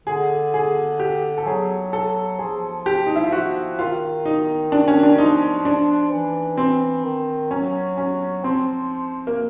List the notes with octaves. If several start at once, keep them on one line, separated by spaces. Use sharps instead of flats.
D3 G#4
G#4
G4
A4
F#3 G#4
A4
F3 G#4
G4
D#4
E4
F4
F3 F#4
D#3 F4
D#4
D4
C#4
D4
F3 D#4
D4
E3
C4
D#3
F#3 C#4
C#4
F3 C4
A#3